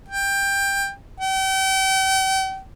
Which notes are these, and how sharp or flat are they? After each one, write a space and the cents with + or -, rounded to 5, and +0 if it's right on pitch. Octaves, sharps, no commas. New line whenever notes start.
G5 +15
G5 -40